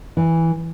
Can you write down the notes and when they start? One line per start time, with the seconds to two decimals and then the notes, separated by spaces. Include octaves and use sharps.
0.17 E3